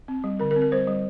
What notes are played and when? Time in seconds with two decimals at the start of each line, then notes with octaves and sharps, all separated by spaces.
0.08 C4
0.24 G3
0.39 D3 A#4
0.51 A#4
0.56 C4
0.62 A#4
0.72 G3 C5
0.87 G3